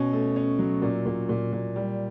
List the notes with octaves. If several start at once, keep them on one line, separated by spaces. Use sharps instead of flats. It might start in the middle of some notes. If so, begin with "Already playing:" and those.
Already playing: B2 C#4
A3
C#4
F#3
A#2
A#2
A#2
A#2
G3